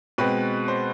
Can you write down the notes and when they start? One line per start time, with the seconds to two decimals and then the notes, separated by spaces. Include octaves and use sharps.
0.18 B2 G#3 C4 B4
0.68 C5